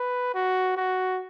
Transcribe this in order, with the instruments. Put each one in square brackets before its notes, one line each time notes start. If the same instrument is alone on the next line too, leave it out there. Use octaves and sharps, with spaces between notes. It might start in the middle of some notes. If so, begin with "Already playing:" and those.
Already playing: [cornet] B4
F#4
F#4